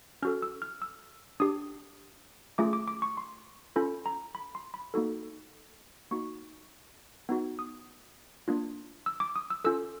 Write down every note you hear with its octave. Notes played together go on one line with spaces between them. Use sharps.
C#4 F#4 A4 F6
E6
F6
E6
D4 G4 D#6
A3 C#4 F4 G#4 D6
D6
D6
C#6
C6
C#4 F4 A4 B5
A#5
B5
C6
B5
A#3 D#4 F#4 A4
A#3 D#4 F#4 C#6
B3 D#4 F#4
D#6
A#3 D4 F4
E6
D6
D#6
E6
C#4 F4 A4 E6